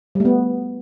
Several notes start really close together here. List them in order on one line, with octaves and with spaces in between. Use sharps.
G3 A3 B3